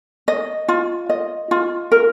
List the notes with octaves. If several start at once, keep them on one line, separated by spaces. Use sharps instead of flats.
D#5
F4
D#5
F4
A#4